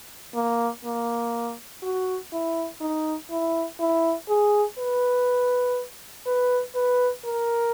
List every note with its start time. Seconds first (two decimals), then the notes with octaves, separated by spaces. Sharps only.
0.35 A#3
0.85 A#3
1.83 F#4
2.33 E4
2.81 D#4
3.31 E4
3.80 E4
4.29 G#4
4.79 B4
6.27 B4
6.75 B4
7.26 A#4